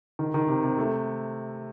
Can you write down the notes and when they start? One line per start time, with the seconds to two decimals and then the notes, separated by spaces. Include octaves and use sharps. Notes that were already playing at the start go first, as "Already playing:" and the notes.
0.19 D#3
0.34 D#3
0.48 C3
0.63 C3
0.78 A3